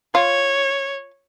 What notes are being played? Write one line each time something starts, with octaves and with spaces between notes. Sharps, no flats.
F4 C#5